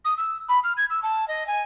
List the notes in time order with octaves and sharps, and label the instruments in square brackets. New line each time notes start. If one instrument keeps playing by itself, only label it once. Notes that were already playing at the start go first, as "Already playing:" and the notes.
[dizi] D#6
E6
B5
F6
G#6
E6
A5
D#5
G#5